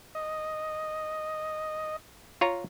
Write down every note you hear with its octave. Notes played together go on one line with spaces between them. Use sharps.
D#5
F4 C#5 A#5